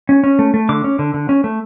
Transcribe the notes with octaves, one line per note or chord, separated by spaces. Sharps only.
C#4
C#4
A3
A3
D3 D6
C#4
D3
D3
C#4
A3